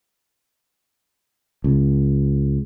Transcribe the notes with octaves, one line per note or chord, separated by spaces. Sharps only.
C#2